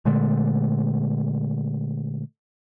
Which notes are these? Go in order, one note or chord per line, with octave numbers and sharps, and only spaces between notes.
A#2 D3 G#3 A3